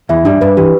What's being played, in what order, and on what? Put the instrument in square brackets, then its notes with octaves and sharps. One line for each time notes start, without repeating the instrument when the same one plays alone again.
[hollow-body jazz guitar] E2 E3 [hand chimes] E5
[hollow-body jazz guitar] G2 G3 [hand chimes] D4
[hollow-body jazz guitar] G2 G3 [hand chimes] B4
[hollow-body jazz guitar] E3 [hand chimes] G4